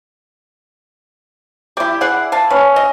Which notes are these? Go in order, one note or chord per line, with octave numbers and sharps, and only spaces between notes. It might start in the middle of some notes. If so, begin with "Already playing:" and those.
G3 E4 G4 D6
G#4 D5 F#5
F5 A5
C#4 B4
D#5